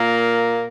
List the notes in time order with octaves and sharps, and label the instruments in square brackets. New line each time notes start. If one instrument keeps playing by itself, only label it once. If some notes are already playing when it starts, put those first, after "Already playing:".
Already playing: [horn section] A#2 A#3